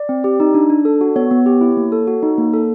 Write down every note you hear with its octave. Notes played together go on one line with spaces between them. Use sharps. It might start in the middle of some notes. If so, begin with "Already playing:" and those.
Already playing: D5
C4
G4
D#4
D4
D4
A4
F#4
B3 C#5
B3
G4
E4
A#3
A4
F#4
D#4
A#3
A4